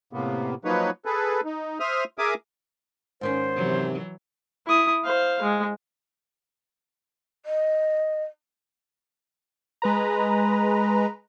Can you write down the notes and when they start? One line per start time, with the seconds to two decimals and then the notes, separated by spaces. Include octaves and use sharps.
0.13 A2 C3 A#3 B3
0.65 F3 F#3 A#3 D#4 B4 C#5
1.05 G#4 A4 B4
1.45 D#4
1.80 C5 E5 D#6 F6
2.18 G#4 A#4 E5 G#5 D6 D#6
3.21 G#2 D#3 C#4 C5
3.56 C3 E3 F#3
4.67 E4 D#6
5.04 C5 F5
5.42 G#3
7.46 D#5
9.82 G#3 B4 A#5